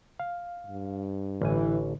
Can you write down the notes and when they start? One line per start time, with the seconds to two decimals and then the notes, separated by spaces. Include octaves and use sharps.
0.20 F5
0.67 G2
1.42 A1 A2 D3 E3 G#5